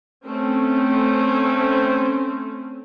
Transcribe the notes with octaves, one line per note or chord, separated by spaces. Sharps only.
A3 C4 C#4